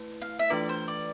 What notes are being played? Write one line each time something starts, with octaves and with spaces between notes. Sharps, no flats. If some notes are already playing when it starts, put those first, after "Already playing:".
Already playing: A3 E4 B4
F5
E5
E3 A3 D4 F4 B4 D5
C5
D5